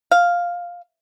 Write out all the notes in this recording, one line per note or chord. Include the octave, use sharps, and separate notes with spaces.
F5